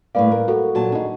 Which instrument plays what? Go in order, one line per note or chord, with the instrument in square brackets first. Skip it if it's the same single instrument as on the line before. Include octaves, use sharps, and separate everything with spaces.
[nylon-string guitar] A2 D5 [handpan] G3 A#3 B4 [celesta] F5
[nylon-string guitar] A#4
[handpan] F#4 [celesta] A4
[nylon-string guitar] A#2 F#3 A5 [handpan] F#4
[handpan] D4 D#4 [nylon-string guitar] G#4